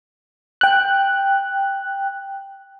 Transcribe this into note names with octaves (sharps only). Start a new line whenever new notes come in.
G5 F#6